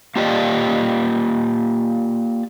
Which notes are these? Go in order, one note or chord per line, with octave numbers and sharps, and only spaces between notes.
A#3 F4 G4 D5 D#5